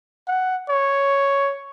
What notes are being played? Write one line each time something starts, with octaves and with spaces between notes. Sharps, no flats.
F#5
C#5